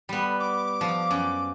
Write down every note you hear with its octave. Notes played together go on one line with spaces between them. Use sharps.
G3 B3
D6
F3
F#2